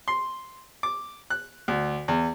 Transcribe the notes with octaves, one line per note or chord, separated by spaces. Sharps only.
C6
D6
F#6
D2
E2